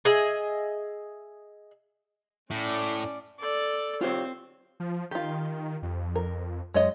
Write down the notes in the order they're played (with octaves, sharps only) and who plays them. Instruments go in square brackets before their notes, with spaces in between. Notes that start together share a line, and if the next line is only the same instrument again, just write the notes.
[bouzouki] G#4 D#5 E5
[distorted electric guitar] A2 [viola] C#4 D5
[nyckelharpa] A4 D5
[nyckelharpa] C4 C5 [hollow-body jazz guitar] F4 G4 C#5
[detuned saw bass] F3
[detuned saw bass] D#3 [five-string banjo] F4 G4
[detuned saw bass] F2
[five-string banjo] A#4
[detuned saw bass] F#2 [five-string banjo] G#3 C#5 D#5